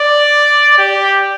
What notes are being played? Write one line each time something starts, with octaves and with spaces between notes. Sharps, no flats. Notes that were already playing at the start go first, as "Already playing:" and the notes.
Already playing: D5
G4